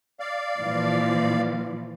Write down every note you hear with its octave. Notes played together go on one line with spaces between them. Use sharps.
D5 F5
A#2 E3 F3